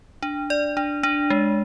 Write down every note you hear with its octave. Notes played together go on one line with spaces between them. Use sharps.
D4
D5
D4
D4
G#3